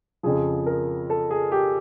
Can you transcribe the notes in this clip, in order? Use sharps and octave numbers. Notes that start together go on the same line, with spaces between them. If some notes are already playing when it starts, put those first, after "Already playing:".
F2 C#3 F3 G#4
A#4
A4
G#4
G4